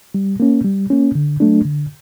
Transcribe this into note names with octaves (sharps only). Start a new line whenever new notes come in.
G3
A#3 C#4
G3
A#3 C#4
D3
F#3 A3 D4
D3